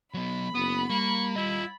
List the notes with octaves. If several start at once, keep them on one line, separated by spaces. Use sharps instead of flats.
F#3 B3 B5
F#1 B3 D#6
G3 A#3 C#6
E4 F4 D#5